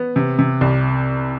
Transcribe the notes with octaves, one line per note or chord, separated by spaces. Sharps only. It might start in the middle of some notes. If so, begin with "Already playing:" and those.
Already playing: B3
C3
C3
C2